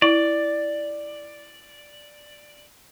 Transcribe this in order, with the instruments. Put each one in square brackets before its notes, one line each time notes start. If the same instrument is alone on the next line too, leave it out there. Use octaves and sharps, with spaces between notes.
[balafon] E4 [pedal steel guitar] D5